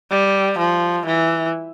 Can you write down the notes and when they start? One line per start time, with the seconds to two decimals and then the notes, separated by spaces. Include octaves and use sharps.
0.11 G3
0.59 F3
1.06 E3